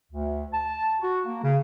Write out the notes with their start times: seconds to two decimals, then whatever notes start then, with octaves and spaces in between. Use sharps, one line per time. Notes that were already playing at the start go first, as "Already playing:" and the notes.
0.12 D2
0.53 A5
1.01 F#4
1.25 A#3
1.43 C#3